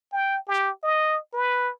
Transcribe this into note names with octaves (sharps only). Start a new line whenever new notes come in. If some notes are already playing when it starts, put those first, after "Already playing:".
G5
G4
D#5
B4